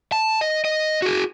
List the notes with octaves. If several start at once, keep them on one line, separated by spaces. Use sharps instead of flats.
A5
D#5
D#5
F#4 G#4